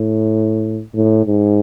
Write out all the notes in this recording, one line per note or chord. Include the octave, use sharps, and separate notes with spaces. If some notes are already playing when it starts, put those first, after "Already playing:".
Already playing: A2
A2
G#2